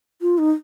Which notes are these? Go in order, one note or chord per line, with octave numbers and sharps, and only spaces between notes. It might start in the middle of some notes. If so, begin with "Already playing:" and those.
F4
D#4